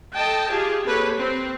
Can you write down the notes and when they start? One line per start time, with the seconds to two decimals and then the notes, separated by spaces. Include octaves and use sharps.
0.15 A4 D#5 G5 A5
0.51 F4 G4 G#4
0.85 A#3 C4 G4 A4 B4 C#5
1.18 C4